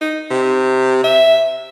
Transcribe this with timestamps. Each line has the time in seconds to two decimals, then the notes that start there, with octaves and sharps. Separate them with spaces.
0.01 D#4
0.30 C3
1.04 E5